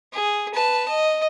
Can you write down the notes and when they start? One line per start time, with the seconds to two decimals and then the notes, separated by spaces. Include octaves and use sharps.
0.13 G#4
0.54 B4 A5
0.88 D#5